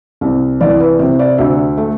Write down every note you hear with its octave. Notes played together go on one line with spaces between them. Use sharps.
C2
E3 D5
B4
C3 G4
D5
D2 E5
A3